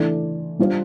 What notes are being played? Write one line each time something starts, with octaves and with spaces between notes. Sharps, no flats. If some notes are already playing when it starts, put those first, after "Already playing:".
Already playing: E3 A3 D4
G3 D4 F4 C5